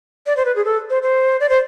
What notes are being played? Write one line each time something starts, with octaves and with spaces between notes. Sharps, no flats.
D5
C5
B4
G#4
A4
C5
C5
D5
C5